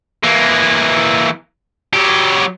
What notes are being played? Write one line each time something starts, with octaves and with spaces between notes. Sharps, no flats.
E3 A#3
F#3 G4